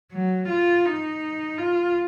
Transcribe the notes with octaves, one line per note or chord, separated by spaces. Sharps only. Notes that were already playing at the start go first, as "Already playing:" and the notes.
F#3
F4
D#4
F4